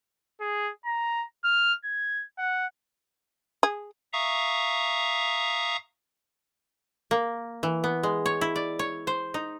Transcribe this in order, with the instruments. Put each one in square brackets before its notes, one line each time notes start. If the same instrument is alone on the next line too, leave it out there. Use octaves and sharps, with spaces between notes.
[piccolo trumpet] G#4
A#5
F6
G#6
F#5
[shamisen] G#4
[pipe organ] E5 F5 A#5 C#6 D#6
[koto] A#3
E3
B3
G#3
C#5
E4
D5
C#5
C5
D#4